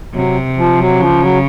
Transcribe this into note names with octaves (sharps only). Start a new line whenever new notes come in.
C3 F#3
F3
F#3
C#3 F3
F#3